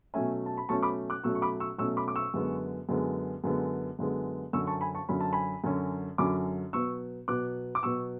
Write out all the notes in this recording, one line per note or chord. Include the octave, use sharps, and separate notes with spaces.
B2 F#3 A3 C#4 E5 G#5
A5
B5
B2 F#3 A3 C#4 A5 C#6
B5 D6
D6 F#6
B2 F#3 A3 C#4 C#6 E6
C#6
B5 D6
C#6 E6
B2 F#3 A3 C#4 C#6 E6
B5 D6
D6
C#6 E6
F#2 D3 G#3 B3
F#2 D3 G#3 B3
F#2 D3 G#3 B3
F#2 D3 G#3 B3
F#2 D3 F#3 C#4 C#6 E6
A5 C#6
G#5 B5
A5 C#6
F#2 D3 F#3 C#4 B5
A5
G#5 B5
F#2 D3 F#3 C#4
F#2 D3 F#3 C#4 B5 D6
B2 F#3 B3 C#6 E6
B2 F#3 B3 D6 F#6
D6
B2 F#3 B3 C#6 E6